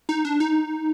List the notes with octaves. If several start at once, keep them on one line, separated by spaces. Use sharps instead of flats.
D#4
D4
D#4